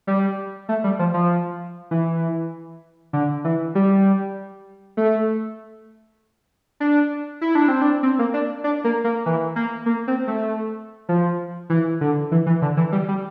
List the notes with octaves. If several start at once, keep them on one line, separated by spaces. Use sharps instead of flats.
G3
A3
G3
F3
F3
E3
D3
E3
G3
A3
D4
E4
D4
C4
D4
C4
A#3
D4
D4
A#3
A#3
E3
A#3
A#3
C4
A3
F3
E3
D3
E3
E3
D3
E3
G3
G3